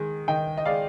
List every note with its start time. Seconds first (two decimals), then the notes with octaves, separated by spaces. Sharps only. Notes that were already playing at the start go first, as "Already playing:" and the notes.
Already playing: D#3 G#3
0.28 D#3 D#5 G5
0.57 D#5
0.66 G#3 D5 F5